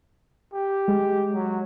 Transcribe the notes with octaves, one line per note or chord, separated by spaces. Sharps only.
G4
G#3
F#3